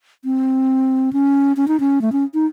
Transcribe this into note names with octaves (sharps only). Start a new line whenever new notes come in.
C4
C#4
C#4
D#4
C#4
A3
C#4
D#4